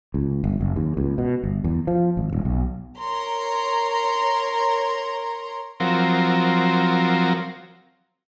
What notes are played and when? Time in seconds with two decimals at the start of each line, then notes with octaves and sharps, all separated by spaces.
0.14 C#2
0.44 G1
0.61 F#1
0.76 D#2
0.97 C#2
1.18 B2
1.43 G1
1.64 E2
1.87 F3
2.17 G#1
2.33 D#1
2.45 B1
2.99 A#4 C#5 A#5 C6
5.80 F3 F#3 C4 A#4